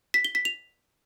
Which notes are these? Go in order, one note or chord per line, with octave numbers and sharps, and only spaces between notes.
B6
G7
B6
F7